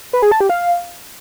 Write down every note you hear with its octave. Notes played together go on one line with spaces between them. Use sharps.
B4
G#4
A5
G4
F5